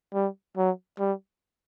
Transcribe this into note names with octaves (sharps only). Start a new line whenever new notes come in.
G3
F#3
G3